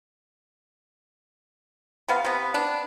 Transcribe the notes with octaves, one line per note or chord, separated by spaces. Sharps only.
C3 B3 F5
C3 B3
B3 D4